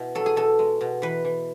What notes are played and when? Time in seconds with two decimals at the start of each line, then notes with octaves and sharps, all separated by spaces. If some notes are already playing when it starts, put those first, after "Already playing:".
Already playing: B2 E4
0.15 F#3 A4
0.26 G#4
0.36 B2 A4
0.59 G#3
0.81 B2
1.02 E3 B4
1.25 E3